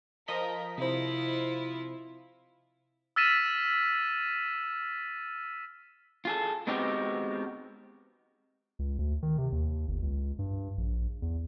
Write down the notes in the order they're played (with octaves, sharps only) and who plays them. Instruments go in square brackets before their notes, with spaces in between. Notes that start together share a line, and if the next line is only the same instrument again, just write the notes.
[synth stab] F3 D#5 B6 [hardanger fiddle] A#4
[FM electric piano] C3 C5 [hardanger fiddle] E4 F4
[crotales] E6 F6 A6 B6 D#7 E7
[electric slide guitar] F4 G#4 A4
G#3 B3 C4 D#4 F#4 G4
[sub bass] C#2
D2
D#3
C3
D#2
G1
C#2
G2
A#1
E2